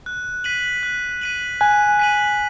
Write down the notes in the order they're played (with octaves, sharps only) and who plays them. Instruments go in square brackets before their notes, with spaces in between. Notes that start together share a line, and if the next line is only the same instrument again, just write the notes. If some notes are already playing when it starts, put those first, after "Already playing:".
[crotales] F#6
B6 D#7 F#7
F#6
B6 D#7 F#7
[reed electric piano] G#5 [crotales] F#6
[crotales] B6 D#7 F#7